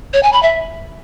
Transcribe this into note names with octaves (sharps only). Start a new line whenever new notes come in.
C#5
G#5
B5
E5